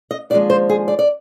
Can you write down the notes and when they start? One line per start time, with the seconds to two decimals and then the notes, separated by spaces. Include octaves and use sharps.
0.11 D#5
0.30 D#2 D3 F3 G#3 D4 D5
0.50 C5
0.69 G#4
0.88 D5
0.99 D5